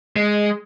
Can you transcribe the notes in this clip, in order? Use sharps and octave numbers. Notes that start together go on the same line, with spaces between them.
G#3